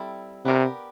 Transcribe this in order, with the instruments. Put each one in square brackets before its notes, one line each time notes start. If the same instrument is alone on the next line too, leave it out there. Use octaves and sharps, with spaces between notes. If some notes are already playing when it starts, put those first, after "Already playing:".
Already playing: [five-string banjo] G3 C4 E4 A4
[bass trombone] C3 [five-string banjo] B3 D4 G4 A#4